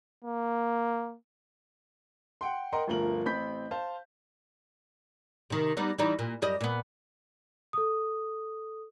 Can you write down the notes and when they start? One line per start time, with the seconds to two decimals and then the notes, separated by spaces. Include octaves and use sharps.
0.25 A#3
2.41 F#5 G5 C6
2.73 A#4 D#5 F#5 G5 A#5 C6
2.87 G1 D2 F3 A#4 F#7
3.25 A1 C4 B5 G6 B6
3.71 C5 F5 A5
5.50 C3 D#3
5.77 G3 B3 D#4
5.98 E3 G3 D#4
6.19 A#2
6.42 F#2 G3 D#5
6.61 A#2 B3
7.73 A4 D#6